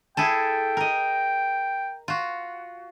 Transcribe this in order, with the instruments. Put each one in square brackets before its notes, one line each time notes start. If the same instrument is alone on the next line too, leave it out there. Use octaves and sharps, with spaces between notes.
[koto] E4 G#4 A4 [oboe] G5
[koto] A#4 D#5
F4 F#4